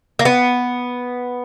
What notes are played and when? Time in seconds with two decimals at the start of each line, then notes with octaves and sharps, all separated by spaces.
0.19 A#3
0.25 B3